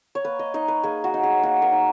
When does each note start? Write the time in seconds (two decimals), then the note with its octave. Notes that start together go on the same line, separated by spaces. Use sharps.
0.15 C#5
0.25 A#3 B4
0.39 D#5
0.54 D#4 D#5
0.68 B4
0.83 A#3 G#4
1.04 F#4
1.14 D#4
1.23 G#4
1.43 A#3 F#4
1.62 A#4
1.72 D#4